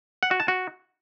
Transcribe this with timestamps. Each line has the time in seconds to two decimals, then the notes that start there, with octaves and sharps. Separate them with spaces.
0.23 F#5
0.31 F#4
0.40 A5
0.48 F#4